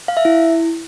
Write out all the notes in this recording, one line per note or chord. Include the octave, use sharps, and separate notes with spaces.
F5
E5
E4